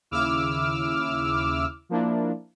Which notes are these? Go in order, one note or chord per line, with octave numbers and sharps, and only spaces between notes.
D#2 C#3 E4 D6 E6 F6
F3 A#3 D4 E4